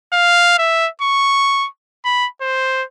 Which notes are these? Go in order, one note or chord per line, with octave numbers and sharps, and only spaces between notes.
F5
E5
C#6
B5
C5